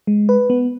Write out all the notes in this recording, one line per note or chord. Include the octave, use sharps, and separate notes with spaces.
G#3
B4
B3